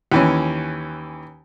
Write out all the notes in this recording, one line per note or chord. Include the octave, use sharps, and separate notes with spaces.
D#2 E3 C#4